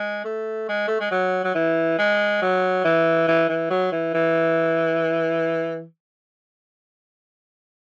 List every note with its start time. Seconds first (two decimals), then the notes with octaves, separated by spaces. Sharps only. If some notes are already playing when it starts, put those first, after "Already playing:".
Already playing: G#3
0.25 A3
0.69 G#3
0.88 A3
1.00 G#3
1.11 F#3
1.44 F#3
1.55 E3
1.98 G#3
2.42 F#3
2.84 E3
3.28 E3
3.49 E3
3.70 F#3
3.92 E3
4.14 E3